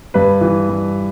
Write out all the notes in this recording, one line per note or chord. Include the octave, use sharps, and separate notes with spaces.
G2 B4
E3
G2